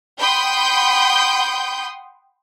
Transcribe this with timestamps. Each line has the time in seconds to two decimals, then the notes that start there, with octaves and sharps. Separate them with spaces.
0.19 F#5 G5 B5 C6 D#6 G6